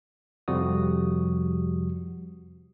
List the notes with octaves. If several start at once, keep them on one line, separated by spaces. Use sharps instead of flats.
F2 C3 F3 G3 F#4 D#6